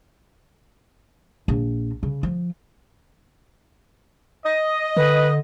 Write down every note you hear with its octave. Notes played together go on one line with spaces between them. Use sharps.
A#1
C#3
F3
D#5
D3 B4